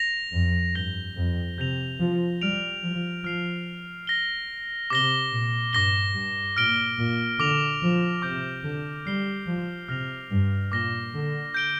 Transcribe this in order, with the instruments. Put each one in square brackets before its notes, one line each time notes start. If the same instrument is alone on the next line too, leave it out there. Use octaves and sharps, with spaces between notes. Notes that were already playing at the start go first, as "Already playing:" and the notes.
Already playing: [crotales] A#6 F7
[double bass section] F2
[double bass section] G2 [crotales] G6 A#6 G7
[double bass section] F2
[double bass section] C3 [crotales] G6 A#6 F7
[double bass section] F3
[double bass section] G3 [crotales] F6 D7 F7
[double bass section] F3
[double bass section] F3 [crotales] F6 C7 F7
[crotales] A#6 G7
[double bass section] C3 [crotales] D6 A#6 G7
[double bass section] A#2
[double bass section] G2 [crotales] D6 A#6 G7
[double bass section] G2
[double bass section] A#2 [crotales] F6 D7 G7
[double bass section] A#2
[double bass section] D3 [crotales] D6 A#6 F7
[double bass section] F3
[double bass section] C3 [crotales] D6 G6 D7
[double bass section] D3
[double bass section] G3 [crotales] F6 C7 G7
[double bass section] F3
[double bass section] C3 [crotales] F6 A#6 F7
[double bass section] G2
[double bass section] A#2 [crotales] D6 A#6 G7
[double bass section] D3
[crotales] G6 D7 G7